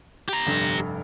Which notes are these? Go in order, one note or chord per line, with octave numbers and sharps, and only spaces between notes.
G4 A#5
F1 G2